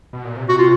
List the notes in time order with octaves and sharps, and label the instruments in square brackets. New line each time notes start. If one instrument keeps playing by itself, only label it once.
[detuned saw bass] B2
A#2
C3
[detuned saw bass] C3 [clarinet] F#4
[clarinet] F4